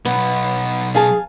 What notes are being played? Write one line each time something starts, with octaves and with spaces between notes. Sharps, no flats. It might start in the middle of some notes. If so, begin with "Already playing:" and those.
B1 B3
G#4 F5 G#5 A5